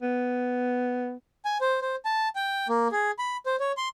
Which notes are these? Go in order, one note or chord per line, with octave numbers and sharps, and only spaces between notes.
B3
G#5
C5
C5
A5
G5
A#3
G#4
B5
C5
C#5
C6